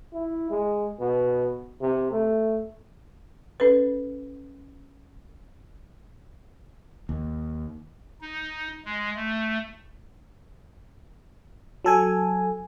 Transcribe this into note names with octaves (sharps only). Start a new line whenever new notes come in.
E4
G#3
B2
C3
A3
C#4 A4 B4
D#2
D#4
G#3
A3
F#3 A4 G#5